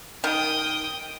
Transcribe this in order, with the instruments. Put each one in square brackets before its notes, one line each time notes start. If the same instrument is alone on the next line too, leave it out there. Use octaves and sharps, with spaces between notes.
[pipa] D#3 [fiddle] G5 D#6